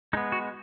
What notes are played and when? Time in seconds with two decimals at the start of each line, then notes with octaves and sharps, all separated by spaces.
0.13 G#3 D#4
0.17 B3
0.32 F#4